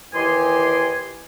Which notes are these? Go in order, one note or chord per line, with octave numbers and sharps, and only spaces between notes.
D#2 E3 G4 D#5 G#5 C6